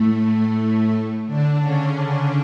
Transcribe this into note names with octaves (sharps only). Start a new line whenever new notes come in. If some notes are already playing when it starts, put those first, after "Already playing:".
Already playing: A2 A3
D3 D4
C#3 C#4
C#3 C#4